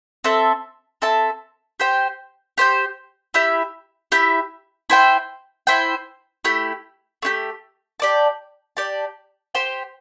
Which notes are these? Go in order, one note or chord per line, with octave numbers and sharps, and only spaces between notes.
C4 A4 E5 A5
C4 A4 E5 A5
G4 C5 G5
G4 C5 G5
E4 G4 E5
E4 G4 E5
E4 C5 G5
E4 C5 G5
A3 E4 G4
A3 E4 G4
G4 D5 A5
G4 D5 A5
G4 C5 G5